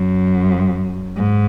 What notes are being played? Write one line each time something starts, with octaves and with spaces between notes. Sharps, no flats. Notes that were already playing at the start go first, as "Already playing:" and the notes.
Already playing: F#2
G#2